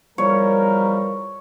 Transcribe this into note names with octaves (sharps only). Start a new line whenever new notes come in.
E2 F3 G3 A#4 C#5